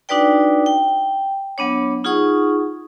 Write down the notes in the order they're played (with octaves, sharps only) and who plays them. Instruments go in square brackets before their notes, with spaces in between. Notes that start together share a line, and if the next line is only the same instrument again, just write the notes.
[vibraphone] D4 D#4 F#4 B4 D5 G5
G5
F#3 B3 D4 C#5
D#4 F4 G#4 F#5 C#6 D#6